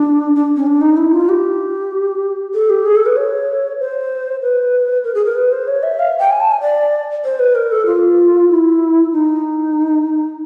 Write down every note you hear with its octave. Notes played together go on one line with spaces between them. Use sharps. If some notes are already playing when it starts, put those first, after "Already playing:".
Already playing: D4
D4
C#4
D4
D#4
E4
F4
G4
A4
G4
G#4
A4
B4
C#5
C5
B4
A#4
G#4
A#4
B4
C5
C#5
E5
F5
G5
G#5
A5
G#5
D5
C5
B4
A#4
A4
F4
E4
D#4